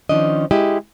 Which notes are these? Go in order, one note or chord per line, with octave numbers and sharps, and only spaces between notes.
D#3 F3 C#4 D4 D#5
G#3 E4 G4 D#5